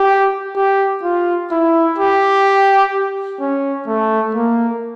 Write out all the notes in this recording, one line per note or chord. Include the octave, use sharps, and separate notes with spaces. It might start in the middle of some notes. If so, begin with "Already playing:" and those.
Already playing: G4
G4
F4
E4
G4
C#4
A3
A#3